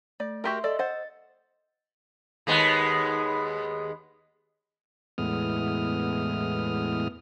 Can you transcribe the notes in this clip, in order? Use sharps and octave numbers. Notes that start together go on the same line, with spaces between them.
A3 D5
F#4 G4 A#4 E5 C6
A4 D5 D#5 E6
C5 F#5 A6
D#2 G#3 B3
E2 A2 G#3 B3 D#6 F6